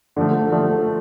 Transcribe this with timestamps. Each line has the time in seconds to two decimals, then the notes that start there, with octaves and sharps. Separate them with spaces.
0.16 D3 F3 A3
0.52 D3 F3 A3